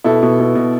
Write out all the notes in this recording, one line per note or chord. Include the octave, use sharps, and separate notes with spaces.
B2 E4 A4
B2
B2
B2